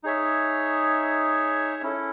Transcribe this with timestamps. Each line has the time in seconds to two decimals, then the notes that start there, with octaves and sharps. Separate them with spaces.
0.04 D#4 G#4 C#5 E5
1.82 C#4 E4 A4